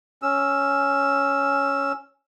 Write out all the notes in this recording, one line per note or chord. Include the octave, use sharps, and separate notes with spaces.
C#4 E6